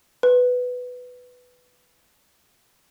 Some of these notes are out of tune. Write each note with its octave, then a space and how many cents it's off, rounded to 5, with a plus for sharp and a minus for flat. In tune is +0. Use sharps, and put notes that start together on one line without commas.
B4 +5